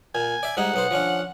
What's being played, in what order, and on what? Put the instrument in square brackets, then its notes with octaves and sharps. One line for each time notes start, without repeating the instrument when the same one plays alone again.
[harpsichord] A#2 [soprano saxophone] G#5
[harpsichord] D5 E5
[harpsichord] G#2 G3 D#4 [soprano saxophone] F#5
[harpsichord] B1 B3 C5
F3 C#4 D4